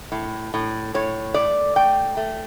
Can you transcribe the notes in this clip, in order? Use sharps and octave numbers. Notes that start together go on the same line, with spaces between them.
A2
A2
A2 C#5
A3 D5
A3 G5
A3